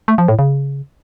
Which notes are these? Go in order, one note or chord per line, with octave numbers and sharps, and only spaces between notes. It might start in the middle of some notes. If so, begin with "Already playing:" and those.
A3
F3
A2
C#3